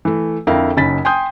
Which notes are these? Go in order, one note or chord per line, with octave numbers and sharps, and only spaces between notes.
E3 A3
F2 D3 E4 A#4 F5 G5
F#1 C#4 D#4 B5 A6 B6
G5 G#5 C6 D#6 G6